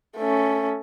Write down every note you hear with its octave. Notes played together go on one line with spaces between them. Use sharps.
A3 C#4